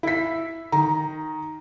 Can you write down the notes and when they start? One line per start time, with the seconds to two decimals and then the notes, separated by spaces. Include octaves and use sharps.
0.03 E4 B6
0.72 D#3 A#5